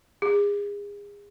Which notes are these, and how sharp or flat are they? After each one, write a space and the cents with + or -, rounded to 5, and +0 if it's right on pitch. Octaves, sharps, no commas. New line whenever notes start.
G#4 -30